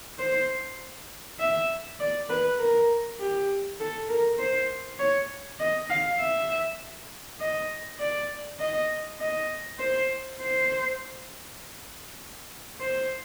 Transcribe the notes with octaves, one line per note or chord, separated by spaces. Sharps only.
C5
E5
D5
B4
A#4
G4
A4
A#4
C5
C#5
D#5
F5
E5
D#5
D5
D#5
D#5
C5
C5
C5